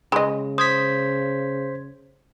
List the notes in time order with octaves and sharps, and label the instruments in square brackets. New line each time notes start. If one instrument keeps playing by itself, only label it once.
[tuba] C#3 [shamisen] G#3 D#5 [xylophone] B5
[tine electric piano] C5 G#6 B6 [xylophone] D#6